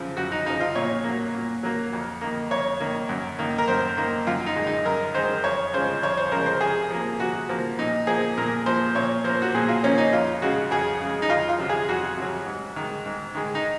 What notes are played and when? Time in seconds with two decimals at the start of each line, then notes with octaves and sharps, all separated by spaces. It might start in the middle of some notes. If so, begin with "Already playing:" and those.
Already playing: F#2 C#3 F3
0.17 F#2 F#4
0.32 D#4
0.46 C#3 F3 D#4
0.60 F4
0.75 A#2 C#5
1.04 F#3 A#3
1.35 A#2
1.63 F#3 A#3
1.93 F2
2.21 D#3 A#3
2.51 F2 C#5
2.80 D#3 A#3
3.09 F#2
3.39 D#3 A#3
3.58 A#4
3.68 F#2 C5
3.97 D#3 A#3
4.27 F#2 F4
4.46 D#4
4.56 D#3 G#3
4.67 D#4
4.85 F#2 A#4
5.14 D#3 G#3 C5
5.44 F2 C#5
5.73 C#3 F3 G#3 C5
6.03 F2 C#5
6.17 C5
6.32 C#3 F3 G#3 A#4
6.46 C5
6.61 C3 G#4
6.91 F3 A#3
7.19 C3 F#4
7.49 F3 A#3
7.79 A#2 D#4
8.07 F3 A#3 G#4
8.38 A#2 A#4
8.66 F3 A#3 C5
8.95 A#2 C#5
9.24 F3 A#3 C5
9.42 F#4
9.55 A#2 G#4
9.69 F4
9.83 F3 A#3 C#4
9.98 D#4
10.13 F2 F4
10.42 C#3 G#3 F#4
10.71 F2 G#4
11.00 C#3
11.05 G#3
11.22 D#4
11.29 F2 F4
11.49 F4
11.59 C3 F#3
11.69 G#4
11.89 F2 F#4
12.17 C3 F#3
12.47 G#2
12.76 D#3 G#3
13.06 G#2
13.35 D#3 G#3
13.55 D#4